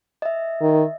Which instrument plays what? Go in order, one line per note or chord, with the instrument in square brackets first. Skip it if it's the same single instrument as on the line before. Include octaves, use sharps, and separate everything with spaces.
[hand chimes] D#5 E5
[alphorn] D#3